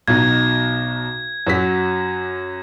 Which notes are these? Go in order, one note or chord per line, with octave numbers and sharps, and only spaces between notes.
B1 B2 D#4 G#6
F#2 F#3 B6